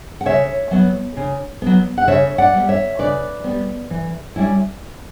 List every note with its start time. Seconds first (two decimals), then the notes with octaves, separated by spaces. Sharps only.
0.21 F#5
0.26 C#3 C#5 E5
0.71 F#3 B3
1.17 C#3
1.62 F#3 B3
1.98 F#5
2.07 C#3 C#5 E5
2.38 D5 F#5
2.53 G3 B3
2.69 C#5 E5
2.99 C#3 B4 D5
3.44 G3 B3
3.90 E3
4.36 G3 C#4 E4